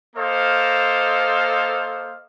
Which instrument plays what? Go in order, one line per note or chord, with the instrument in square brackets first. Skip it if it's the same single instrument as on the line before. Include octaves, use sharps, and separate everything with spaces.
[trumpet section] A#3 A4 C5 D#5 F5